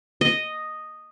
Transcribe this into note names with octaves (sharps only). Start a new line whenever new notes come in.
D#5